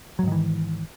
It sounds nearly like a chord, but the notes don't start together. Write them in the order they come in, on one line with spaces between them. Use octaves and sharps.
F#3 G#2 D#3 E3